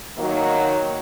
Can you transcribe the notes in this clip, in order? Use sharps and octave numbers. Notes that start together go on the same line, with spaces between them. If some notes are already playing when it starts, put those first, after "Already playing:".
D#3 F#3 A#3